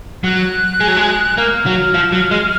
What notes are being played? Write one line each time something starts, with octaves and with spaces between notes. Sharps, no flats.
F#3 F#6
G#3
F#3
G#3
A#3 F6
F#3
F3
F#3
G#3